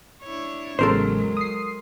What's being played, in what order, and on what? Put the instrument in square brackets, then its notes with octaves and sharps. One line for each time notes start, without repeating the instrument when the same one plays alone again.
[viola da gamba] D4 E4 C#5
[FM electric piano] A1 E2 C#3 [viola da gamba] F#3 G#3 [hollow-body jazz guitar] A4 A#4 C5
[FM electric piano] D#6 C7